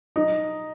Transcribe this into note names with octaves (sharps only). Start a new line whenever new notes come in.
D#4